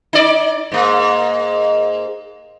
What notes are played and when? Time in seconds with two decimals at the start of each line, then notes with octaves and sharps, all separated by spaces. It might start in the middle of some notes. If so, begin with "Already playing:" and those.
0.13 D#4 D5
0.72 G#2 A#3